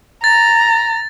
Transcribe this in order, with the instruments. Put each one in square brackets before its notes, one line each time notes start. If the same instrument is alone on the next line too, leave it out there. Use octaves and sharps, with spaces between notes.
[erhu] A#5 [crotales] A6